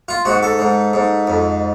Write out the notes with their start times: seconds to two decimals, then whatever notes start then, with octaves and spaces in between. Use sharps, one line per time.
0.08 F4
0.25 G#2 F#4
0.43 A4
0.59 G#2
0.93 G#2
1.27 F2